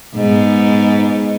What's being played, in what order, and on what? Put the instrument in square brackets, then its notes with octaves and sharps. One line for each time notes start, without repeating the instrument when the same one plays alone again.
[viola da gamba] G#2 B3